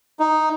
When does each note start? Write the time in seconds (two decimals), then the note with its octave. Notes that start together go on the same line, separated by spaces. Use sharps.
0.19 D#4